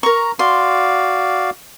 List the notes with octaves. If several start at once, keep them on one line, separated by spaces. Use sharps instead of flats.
A#4 A#5 C#6
F#4 D5 F5 C6